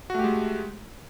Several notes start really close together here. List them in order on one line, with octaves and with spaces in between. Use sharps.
F#4 A3 G4 G#3